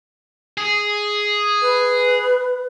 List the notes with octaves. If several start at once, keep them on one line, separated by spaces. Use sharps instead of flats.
G#4
B4